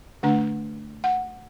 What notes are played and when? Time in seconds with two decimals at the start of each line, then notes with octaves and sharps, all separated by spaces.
0.23 D3 A3 D4 F#5
1.04 F#5